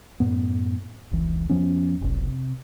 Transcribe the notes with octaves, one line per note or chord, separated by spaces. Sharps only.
F#2 A2 B3
F1 C#2 E3
F2 F3 B3 C#4
F1 B1
C3